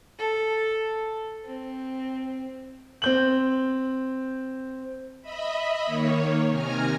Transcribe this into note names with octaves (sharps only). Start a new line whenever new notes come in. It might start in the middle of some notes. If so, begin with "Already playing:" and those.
A4
C4
C4 G6 F#7
D#5 E5 B5
D#3 A#3 C#5
C3 D#3 G#5 A#5 F6